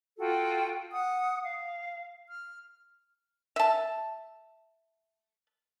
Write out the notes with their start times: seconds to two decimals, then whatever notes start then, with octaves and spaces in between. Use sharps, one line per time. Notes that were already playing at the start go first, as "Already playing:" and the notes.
0.19 F4 F#4 A4 G5
0.93 F#5 D#6
1.44 F5
2.28 F6
3.56 E5 A5